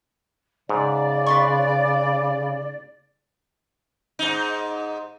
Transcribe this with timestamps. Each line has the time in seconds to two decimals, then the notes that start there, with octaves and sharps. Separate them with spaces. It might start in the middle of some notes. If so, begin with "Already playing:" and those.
0.69 G#2 C#3 D5
1.26 B4 C6 C#6
4.19 G#2 D#4